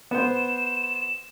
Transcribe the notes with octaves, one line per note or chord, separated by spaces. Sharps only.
B3 C5 E7